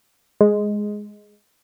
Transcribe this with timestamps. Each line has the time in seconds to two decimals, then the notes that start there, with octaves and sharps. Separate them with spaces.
0.41 G#3